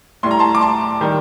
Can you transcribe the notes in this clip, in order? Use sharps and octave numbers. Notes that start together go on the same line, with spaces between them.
A2 G3 C6
A#5
A5 C6
D6
A5 C6
D#3 G3